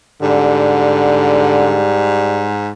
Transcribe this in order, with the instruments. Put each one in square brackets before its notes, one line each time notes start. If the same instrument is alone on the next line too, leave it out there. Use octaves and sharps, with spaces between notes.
[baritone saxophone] G#2 [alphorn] D3 [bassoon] G3